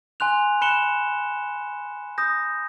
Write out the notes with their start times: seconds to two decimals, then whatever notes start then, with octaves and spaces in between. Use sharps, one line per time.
0.20 G#5 C6 F#6 F7
0.61 B5 F#6 C#7 E7 G7
2.18 D#6 G6 A#6